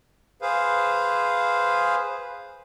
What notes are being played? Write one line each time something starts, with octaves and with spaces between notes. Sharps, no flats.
G#4 B4 C5 F5